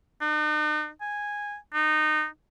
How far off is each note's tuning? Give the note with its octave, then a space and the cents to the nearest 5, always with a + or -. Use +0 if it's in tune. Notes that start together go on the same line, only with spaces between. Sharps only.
D#4 -45
G#5 -10
D#4 -20